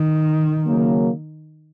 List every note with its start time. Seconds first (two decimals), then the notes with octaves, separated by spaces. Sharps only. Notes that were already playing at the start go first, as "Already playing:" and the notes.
Already playing: D#3
0.66 C#3 F#3 A#3